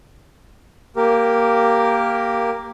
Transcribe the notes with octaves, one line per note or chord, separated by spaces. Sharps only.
A#3 G4 A#4